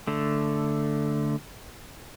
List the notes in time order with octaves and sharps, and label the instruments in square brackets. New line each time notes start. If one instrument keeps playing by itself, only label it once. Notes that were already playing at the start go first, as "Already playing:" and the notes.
[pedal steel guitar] D3 A3